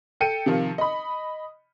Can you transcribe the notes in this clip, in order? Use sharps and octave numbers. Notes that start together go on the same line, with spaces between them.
A4 G5 C#7 D#7
C3 D#3 F3
D#5 B5